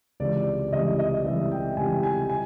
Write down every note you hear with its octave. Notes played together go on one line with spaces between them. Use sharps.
C#2 C3 E3 D5
C#2 C3 E3 D#5
D#5
C#2 C3 E3 E5
G5
C#2 C3 E3 G#5
G#5
G#5